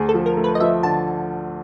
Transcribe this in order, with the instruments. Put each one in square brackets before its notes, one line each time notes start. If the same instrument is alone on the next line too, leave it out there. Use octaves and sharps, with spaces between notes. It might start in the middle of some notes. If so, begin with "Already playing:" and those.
Already playing: [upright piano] D2 [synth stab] G#4
[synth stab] A4
[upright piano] F3
[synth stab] A#4
[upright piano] A3
[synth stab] B4
D#5
[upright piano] F3 [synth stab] E5
[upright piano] D3 [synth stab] A5